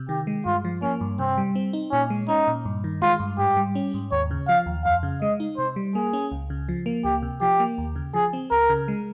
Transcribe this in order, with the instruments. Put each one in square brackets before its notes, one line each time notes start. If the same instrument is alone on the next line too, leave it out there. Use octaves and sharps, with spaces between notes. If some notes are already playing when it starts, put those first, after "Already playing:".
Already playing: [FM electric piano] C3
[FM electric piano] D#3 [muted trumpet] G4
[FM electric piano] G#3
[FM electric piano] G2 [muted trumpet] F4
[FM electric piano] F3
[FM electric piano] A#3 [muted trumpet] C#4
[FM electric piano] G2
[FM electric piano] C3 [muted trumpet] C4
[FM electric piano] G3
C4
D#4
[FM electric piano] A#2 [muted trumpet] C#4
[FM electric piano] G#3
[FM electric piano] C#4 [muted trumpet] D#4
[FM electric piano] A#2
G2
D#3
[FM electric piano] G#3 [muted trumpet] F4
[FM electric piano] G2
[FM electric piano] G#2 [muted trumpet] G4
[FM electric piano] G3
C#4
G#2
[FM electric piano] D#2 [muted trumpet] C#5
[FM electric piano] C#3
[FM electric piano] F3 [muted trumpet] F5
[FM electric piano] D#2
[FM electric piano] F2 [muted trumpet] F5
[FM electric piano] C#3
[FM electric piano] G#3 [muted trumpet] D#5
[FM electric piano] D#4
[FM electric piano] C3 [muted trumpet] C5
[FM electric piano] G3
[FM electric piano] A#3 [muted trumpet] G#4
[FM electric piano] C#4
C#2
C#3
F3
A#3
[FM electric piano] C#2 [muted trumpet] G4
[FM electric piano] C3
[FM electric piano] F3 [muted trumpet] G4
[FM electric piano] A#3
D#2
C#3
[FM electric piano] F3 [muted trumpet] G#4
[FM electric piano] C4
[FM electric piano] C#2 [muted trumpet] A#4
[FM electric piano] C#3
G#3